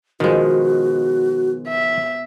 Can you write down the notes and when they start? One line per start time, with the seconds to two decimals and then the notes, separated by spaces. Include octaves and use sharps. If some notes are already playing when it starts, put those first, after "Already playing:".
0.20 B2 D#3 F3 G#3 F#4
1.68 E5